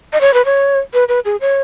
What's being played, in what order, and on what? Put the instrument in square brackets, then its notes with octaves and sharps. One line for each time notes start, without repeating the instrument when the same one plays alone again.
[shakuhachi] D#5
C#5
B4
C#5
B4
B4
G#4
C#5